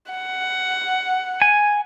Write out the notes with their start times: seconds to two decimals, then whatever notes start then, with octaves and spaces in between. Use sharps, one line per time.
0.11 F#5
1.42 G#5